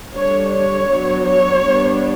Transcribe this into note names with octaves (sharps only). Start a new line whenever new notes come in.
D3 G3 D4 C#5
C#5
F#3 B3 D4
C#5
G3 B3 D4